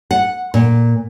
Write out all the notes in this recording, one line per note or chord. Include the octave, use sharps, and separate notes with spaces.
F#5
A#2